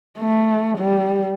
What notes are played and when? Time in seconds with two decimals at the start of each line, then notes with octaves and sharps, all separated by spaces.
0.19 A3
0.78 G3